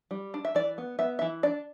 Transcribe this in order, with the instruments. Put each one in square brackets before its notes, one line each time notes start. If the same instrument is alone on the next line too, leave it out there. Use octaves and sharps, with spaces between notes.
[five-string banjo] G3
D4
E5
E3 D5
B3
B3 E5
E5
E3
D4 D5